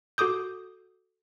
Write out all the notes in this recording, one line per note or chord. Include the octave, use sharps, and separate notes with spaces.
F#4 A4 D6 D#6 G6